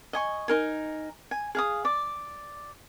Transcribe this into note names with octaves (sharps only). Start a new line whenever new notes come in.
D#5 G#5 C#6
D#4 A#4 G#5
G#5
G#4 F5 D#6
D5 D6